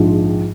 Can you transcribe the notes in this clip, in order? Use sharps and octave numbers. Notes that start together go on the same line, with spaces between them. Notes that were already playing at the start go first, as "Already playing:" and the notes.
Already playing: A#1 G#2 F3